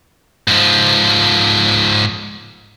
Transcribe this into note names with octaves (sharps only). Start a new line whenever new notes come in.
G#2 F3